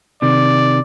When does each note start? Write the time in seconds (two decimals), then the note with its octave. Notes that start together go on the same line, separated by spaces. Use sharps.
0.22 C3 D#3 D5